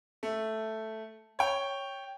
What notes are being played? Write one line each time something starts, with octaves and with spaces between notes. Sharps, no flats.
A3
C#5 G5